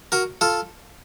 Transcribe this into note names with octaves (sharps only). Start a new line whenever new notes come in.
F#4 A#4
F4 A4